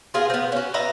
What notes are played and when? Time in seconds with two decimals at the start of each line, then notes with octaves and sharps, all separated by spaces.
0.14 B3 F4 G#4 A#4
0.30 B3 C4
0.52 C#4 F#4
0.74 B4 D#5 E5 A#5